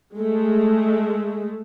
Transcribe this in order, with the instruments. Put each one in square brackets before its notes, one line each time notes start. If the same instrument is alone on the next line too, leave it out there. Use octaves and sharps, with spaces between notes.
[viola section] G#3 A3